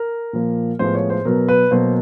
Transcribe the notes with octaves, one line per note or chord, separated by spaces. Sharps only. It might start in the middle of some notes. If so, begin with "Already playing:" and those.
Already playing: A#4
A#2 F3 A#3
A2 F3 G#3 B3 C5
C#5
C5
B2 F#3 B3 A#4
B4
B2 F#3 A#3 C5